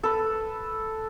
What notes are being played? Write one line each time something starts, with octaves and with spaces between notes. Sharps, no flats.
A4 B4